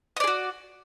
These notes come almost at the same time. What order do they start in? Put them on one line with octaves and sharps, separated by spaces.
D#5 D5 G#4 F#4